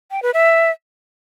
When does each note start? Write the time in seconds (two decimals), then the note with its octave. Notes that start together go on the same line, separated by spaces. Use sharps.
0.11 G5
0.23 B4
0.34 E5